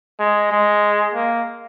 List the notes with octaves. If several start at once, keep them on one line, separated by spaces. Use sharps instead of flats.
G#3
G#3
A#3